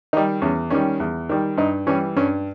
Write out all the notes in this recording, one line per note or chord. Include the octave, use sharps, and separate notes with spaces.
D#3 G3 D#4
E2 C#4
D#3 G3 C#4
E2
D#3 G3
G2 D#4
E3 G3 C#4
G2 C#4